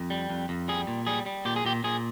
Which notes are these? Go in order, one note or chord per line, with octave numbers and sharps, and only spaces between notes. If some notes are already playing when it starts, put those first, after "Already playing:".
Already playing: F2
G3
F2
F2
G3 G#4
A#2
G3 G#4
G3
A#2 G4
G#4
A#2 G4
A#2 G#4